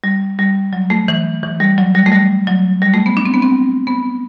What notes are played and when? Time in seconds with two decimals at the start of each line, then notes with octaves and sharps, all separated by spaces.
0.04 G3
0.39 G3
0.73 F#3
0.90 A3
1.08 E3
1.43 E3
1.60 G3
1.78 F#3
1.95 G3
2.06 A3
2.12 G3
2.47 F#3
2.82 G3
2.93 A3
3.06 B3
3.17 D4
3.25 C4
3.34 B3
3.42 C4
3.87 B3